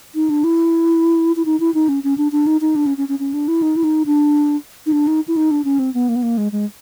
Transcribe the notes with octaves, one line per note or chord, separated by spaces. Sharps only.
D#4
D4
E4
E4
D#4
E4
D#4
C#4
C#4
D4
D4
D#4
D#4
D4
C#4
C#4
C#4
C#4
D4
E4
D#4
E4
D#4
D4
D#4
D4
D#4
E4
D#4
D4
C#4
C4
B3
A#3
B3
A#3
G#3
G#3